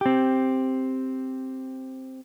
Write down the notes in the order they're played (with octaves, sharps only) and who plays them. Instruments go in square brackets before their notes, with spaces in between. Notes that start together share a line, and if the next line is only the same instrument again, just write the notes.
[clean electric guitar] C4 G4